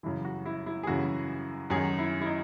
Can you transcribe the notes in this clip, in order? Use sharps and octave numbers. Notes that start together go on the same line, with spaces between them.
F#2 C#3 E3 E4
F#4
E4
E4
G#4
F#2 C#3 E3 F#4
F#2 D#3 G#4
E4
E4
D#4